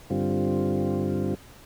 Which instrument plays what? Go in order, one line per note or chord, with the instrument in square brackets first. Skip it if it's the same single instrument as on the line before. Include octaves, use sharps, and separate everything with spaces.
[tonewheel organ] G2 D3 G3 C4 F4